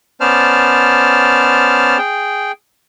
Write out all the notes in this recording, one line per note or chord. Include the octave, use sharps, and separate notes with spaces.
B3 C#4 C5 D5 A5 F6
G#4 G5